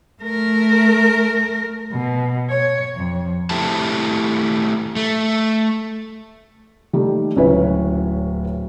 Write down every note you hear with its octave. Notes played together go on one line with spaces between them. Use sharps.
A3 A#4
B2
C#5
F2
A3 C4 E4 G4 C5 A5
A3
D#3 G3 A3
D1 C#2 C#4 E4 B4 C#5